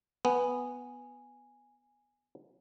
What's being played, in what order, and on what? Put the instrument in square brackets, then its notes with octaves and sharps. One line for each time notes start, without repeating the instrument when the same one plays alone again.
[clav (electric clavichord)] B3 [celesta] G#5